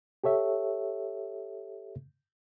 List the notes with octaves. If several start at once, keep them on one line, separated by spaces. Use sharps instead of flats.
G4 A4 C#5 E5